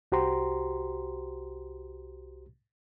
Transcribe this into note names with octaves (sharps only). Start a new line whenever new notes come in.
C2 F#4 G4 C5 A#5 C6